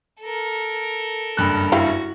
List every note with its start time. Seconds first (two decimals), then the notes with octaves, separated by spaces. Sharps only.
0.21 A4 A#4
1.37 F#1 G2 F#6
1.72 E4 F#4 G4 F5